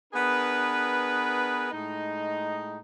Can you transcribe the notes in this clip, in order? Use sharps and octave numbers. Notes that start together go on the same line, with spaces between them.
B3 D4 G#4 A#4 B4
A2 G#3 D#4